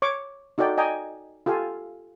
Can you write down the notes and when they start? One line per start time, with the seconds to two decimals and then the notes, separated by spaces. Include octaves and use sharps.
0.02 C#5 C#6 D6
0.58 D#4 F#4 A4 D5 G5
0.77 D5 D#5 G5 G#5 A#5
1.46 F4 G4 A4 F5 G#5